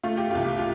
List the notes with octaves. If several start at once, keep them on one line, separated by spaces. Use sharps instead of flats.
A3 F4
G4
C2 F4
G4
F4